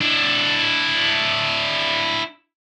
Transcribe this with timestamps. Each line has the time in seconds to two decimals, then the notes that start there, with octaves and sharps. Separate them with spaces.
0.01 D4 E4